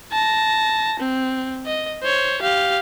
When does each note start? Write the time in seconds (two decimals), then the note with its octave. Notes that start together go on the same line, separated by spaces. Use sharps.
0.12 A5 A#6
1.00 C4
1.66 D#5
2.03 C5 C#5
2.42 G4 F5